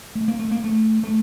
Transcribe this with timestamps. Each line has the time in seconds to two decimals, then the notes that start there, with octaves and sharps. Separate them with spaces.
0.15 A3
0.28 A#3
0.39 A3
0.51 A#3
0.64 A3
1.03 A3